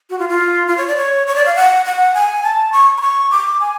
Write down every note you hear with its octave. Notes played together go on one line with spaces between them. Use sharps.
F#4
F4
F4
F4
C#5
D5
C#5
C#5
D5
F5
F#5
F#5
G#5
A5
C#6
B5
C#6
D6
G#5